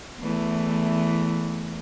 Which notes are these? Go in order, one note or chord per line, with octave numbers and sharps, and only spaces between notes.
E2 E3 A3